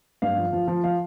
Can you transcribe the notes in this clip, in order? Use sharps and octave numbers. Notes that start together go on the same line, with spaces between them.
G2 F5
F3
F3
F3
F3 F5